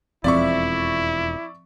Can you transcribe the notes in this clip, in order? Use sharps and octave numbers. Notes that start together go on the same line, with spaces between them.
E1 F2 F3 C4 E4 D5 E5 C#6